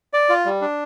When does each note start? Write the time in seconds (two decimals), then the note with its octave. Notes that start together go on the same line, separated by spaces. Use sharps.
0.13 D5
0.29 F4
0.45 G3
0.61 D4